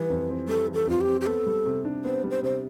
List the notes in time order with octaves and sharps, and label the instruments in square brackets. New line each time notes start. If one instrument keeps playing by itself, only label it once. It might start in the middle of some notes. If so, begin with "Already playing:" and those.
Already playing: [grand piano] E3 G3 [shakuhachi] B4
[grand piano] F2
C4
[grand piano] G3 [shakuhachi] A4
[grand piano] E3
[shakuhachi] A4
[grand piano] F2 [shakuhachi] F4
[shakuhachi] G4
[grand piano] C4
[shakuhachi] G4
[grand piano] B3 [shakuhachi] A4
[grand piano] G3
C3
D4
[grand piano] B3 [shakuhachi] C5
[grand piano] G3
[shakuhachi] C5
[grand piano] C3 [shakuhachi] C5